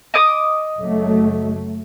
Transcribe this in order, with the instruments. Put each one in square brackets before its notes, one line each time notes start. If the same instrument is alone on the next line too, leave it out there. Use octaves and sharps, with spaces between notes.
[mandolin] D#5 D6 D#6
[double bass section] F#1 F#3 A3